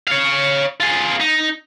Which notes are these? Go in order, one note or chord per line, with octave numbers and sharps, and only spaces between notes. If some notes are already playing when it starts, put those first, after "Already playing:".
C#5 F5
F4 G#4
D#4